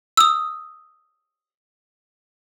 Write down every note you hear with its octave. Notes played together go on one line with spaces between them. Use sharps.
D#6 E6